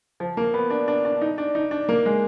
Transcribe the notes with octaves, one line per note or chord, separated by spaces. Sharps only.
F3
A#3
B3
D4
D4
D4
D#4
D4
D#4
D4
A#3
G#3